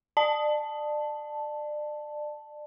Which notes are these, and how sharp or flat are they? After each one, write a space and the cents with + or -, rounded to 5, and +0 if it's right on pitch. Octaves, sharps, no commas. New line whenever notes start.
D5 +30 A5 +0